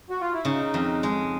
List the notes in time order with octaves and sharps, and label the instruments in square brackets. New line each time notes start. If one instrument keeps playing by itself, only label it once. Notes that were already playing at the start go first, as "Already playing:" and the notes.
[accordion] F#4
F4
E4
[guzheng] C#3 [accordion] D#4
[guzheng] F2
G#3